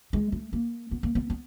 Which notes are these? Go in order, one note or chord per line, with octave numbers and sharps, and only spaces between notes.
G#3
A3
A#3
B3
A#3
B3
B3